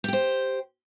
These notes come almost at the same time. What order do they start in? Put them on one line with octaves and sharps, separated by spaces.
G4 G5 C5